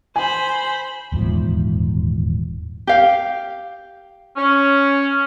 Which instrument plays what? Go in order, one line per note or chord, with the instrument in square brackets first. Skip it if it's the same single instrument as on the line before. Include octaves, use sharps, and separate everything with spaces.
[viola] C5 B5 [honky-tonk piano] G#5
[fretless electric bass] D#1 E2 G#2 F3
[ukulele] G4 F5
[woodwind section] C#4